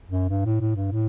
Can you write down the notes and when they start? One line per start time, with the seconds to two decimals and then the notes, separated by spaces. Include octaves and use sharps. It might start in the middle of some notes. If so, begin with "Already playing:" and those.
0.09 F#2
0.30 G2
0.45 A2
0.61 A2
0.76 G2
0.92 A2